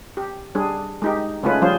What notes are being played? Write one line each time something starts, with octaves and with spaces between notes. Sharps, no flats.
G4
G3 D4 G#4
G#3 D#4 G4
C#3 G#3 A3 C#4 F4 B4
F3 G3 C#4 F4 G#4 C5